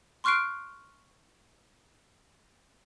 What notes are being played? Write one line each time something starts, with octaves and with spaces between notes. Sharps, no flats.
C6 C#6 F6 F#6 C7 D7